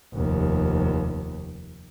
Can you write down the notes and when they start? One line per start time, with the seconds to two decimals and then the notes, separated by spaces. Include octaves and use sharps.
0.15 F1 D#2